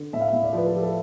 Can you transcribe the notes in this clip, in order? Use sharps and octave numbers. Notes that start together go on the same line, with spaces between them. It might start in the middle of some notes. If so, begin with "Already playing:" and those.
Already playing: D3
A2 E5
F5
A2 E5
D5
F3 B4
A4
F3 G4
A4